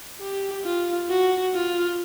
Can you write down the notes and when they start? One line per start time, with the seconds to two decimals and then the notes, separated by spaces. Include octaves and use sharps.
0.21 G4
0.65 F4
1.10 F#4
1.55 F4